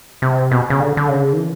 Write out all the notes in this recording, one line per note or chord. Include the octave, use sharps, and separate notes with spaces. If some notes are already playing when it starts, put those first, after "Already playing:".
C3
B2
C#3
D3
D3
C#3
D#3
E3